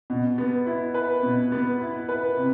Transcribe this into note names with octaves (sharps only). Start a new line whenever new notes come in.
B2
B3
E4
B4
B2
B3
E4
B4
C3